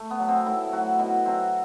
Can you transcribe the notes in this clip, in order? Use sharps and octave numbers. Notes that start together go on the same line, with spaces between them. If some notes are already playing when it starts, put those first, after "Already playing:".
Already playing: A3
B3
F#3
C4
A2 E4
F#3 F#4
B2 E4
F#3 C4